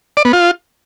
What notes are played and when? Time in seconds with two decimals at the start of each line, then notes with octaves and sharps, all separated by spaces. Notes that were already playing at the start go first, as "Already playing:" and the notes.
0.17 D5
0.25 B3
0.33 F4